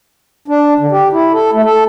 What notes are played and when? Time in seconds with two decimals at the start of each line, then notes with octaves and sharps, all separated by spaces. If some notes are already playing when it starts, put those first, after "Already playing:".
0.48 D4
0.79 D3
0.92 G4
1.13 E4
1.33 A4
1.53 A3
1.65 A4